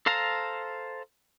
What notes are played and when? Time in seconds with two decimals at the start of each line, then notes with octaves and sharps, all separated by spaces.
0.06 A4 C5 F5 A5 A#5